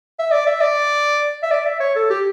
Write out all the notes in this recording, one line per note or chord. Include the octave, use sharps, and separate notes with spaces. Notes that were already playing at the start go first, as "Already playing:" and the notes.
E5
D5
E5
D5
E5
D5
E5
C#5
A4
G4